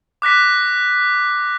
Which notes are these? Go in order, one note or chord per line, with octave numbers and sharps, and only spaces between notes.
D6 F#6 A#6 B6